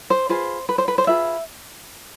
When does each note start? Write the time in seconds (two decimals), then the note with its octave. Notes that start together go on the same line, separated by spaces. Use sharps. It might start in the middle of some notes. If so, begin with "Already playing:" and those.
0.10 C5
0.29 F4 G#4 B4 C5
0.69 B4
0.78 C5
0.88 B4
0.98 C5
1.07 F4 G#4 B4 E5